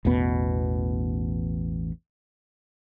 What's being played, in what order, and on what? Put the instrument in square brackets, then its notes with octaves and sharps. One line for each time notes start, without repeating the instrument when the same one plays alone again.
[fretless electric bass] A1 E2 B2 B3